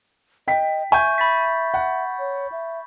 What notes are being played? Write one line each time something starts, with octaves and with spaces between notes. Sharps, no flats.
D#5 G5 B6
E5 G#5 C#6 G6
B5 A6 B6
F#5
C#5
E5